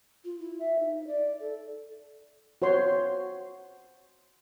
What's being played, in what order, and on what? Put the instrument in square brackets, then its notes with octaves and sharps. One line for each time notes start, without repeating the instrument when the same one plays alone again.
[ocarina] F4
E4
E5
D#4
D5
A4
[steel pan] F#4 C5 C#5 C6